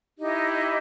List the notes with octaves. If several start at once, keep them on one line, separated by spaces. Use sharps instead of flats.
D#4 E4 G4 D#5